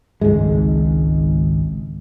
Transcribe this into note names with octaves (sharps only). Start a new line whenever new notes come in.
G#1 C#2 G#2 G#3